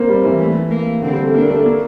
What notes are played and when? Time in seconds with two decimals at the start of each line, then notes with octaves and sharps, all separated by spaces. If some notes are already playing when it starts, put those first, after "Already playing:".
Already playing: A#3 C4
0.09 G3
0.24 E3
0.40 A3
0.71 A#3
1.02 D3 C4
1.12 G3
1.23 A3
1.34 A#3 D4
1.49 A3
1.65 A#3